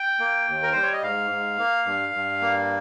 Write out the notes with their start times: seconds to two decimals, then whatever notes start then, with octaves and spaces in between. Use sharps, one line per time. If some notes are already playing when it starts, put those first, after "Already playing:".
Already playing: G5
0.20 A#3
0.48 D#2
0.63 A#4
0.72 G3 C5
0.83 C#5
0.93 D#5
1.03 G#2 F5
1.31 G#2
1.59 A#3
1.86 G2
2.14 G2
2.41 A#3